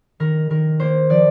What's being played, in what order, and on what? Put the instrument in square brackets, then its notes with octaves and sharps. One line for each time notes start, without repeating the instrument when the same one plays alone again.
[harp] D#3 A#4
D#3 A#4
A#3 C5
F3 D5